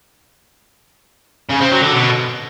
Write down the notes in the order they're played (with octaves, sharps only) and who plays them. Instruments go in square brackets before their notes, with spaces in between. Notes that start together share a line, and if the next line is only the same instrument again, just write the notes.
[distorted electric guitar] C#3
C4
F#3
D3
B2